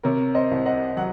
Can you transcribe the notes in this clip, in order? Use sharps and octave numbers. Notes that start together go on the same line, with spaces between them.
C3 A#4 C#5
C5 D#5
C2
D#5 F#5
F#3 F#5